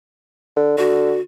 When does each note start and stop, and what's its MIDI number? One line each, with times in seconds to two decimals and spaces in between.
0.57 0.76 50
0.78 1.16 50
0.78 1.20 66